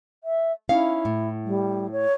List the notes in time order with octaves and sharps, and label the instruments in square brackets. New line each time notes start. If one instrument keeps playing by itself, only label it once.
[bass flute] E5
[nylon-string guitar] C#4 D#4 F5 [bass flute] E4
[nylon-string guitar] A2
[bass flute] G3
C#5